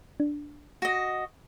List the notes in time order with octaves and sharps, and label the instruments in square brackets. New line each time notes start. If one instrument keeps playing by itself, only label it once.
[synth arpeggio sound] D4
[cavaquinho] F#4 D#5